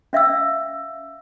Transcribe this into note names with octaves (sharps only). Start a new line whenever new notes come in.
C#4 E5 F5 E6